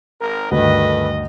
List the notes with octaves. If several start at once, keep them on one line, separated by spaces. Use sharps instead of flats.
G#1 A#4
D2 G2 D3 D#3 A4 B4 D#5